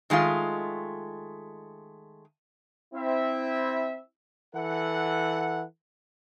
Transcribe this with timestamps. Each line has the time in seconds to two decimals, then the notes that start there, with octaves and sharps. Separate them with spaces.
0.10 D#3 G#3 A3 F4
2.94 C4 E4 E5
4.55 E3 A4 F#5